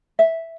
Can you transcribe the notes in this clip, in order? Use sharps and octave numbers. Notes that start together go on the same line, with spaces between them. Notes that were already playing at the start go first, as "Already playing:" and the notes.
E5